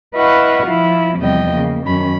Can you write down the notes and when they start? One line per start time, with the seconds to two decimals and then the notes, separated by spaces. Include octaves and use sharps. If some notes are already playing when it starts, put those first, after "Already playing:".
0.14 E4 B4 D#5 F5 F#5 C#6
0.67 F3 E4 F4
1.18 E2 C3 F3 G3 D#5 G5
1.52 C#3 A#3
1.86 F#2 D#3 C#4 B5